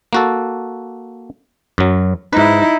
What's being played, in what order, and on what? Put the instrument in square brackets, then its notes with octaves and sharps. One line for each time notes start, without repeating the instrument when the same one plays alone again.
[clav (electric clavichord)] A#3 F#4 A4
F#2 F#3
[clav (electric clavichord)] G#2 B4 [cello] D#4 E4